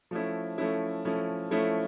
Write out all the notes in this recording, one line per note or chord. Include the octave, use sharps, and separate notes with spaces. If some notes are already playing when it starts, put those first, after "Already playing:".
F3 A3 C#4 E4
F3 A3 C#4 E4
F3 A3 C#4 E4
F3 A3 C#4 E4